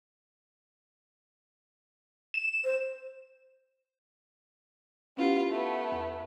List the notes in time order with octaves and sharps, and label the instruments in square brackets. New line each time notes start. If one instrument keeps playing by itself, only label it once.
[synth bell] E7
[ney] C5
[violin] B3 F4 [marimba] C#4 E4 G4
[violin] A3 B3
[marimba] E2